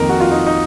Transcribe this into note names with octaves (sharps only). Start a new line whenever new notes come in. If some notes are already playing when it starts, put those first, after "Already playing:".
Already playing: F2 D#3 A#3 A#4
F#4
F4
D#4
D#4